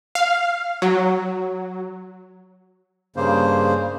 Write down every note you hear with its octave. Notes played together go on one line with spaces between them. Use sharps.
F5
F#3
G2 C#3 A#3 C5